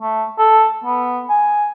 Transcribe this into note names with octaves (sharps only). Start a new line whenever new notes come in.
A3
A4
B3
G#5